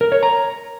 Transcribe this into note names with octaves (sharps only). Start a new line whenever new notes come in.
A#4
C#5
A#5